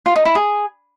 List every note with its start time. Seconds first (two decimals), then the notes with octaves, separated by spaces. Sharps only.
0.06 F4
0.16 D#4
0.25 E4
0.35 G#4